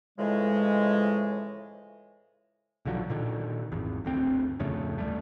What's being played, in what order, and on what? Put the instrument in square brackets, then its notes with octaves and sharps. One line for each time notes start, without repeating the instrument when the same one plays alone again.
[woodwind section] A2 C#3 E3 F3 G#3
[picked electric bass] B1 D3 F3 F#3
A#2 D3 D#3
G#1 E2
G1 D2 C4
D1 F2 C#3 A3
D2 G3 A3